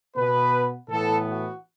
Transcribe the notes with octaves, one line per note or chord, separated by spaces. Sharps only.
B2 B3 B4
A2 E3 B3 A4
F#4